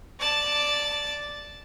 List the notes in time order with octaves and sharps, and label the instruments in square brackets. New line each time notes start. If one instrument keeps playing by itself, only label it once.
[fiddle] D5 A5